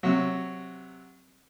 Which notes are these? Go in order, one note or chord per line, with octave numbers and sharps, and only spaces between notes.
C3 F#3